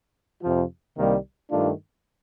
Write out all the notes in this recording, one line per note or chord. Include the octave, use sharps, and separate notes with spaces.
F2 C3 F3
C2 C3 D#3 G3 A#3
G2 D#3 A3 D4 F4